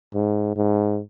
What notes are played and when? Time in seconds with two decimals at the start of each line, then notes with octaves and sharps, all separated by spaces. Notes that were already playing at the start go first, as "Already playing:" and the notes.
0.14 G#2
0.56 G#2